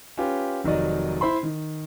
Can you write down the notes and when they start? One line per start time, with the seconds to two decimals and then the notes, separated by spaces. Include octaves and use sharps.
0.17 C#4 F4 G4 B4
0.64 F1 D#3 F#3 D5 D#5
1.21 E4 C5 B5 C6
1.43 D#3